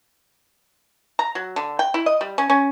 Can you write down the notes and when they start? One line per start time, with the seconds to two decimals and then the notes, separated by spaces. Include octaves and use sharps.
1.19 A#5
1.35 F#3
1.56 D3
1.79 G5
1.94 E4
2.06 D#5
2.21 G3
2.38 C#4
2.50 C#4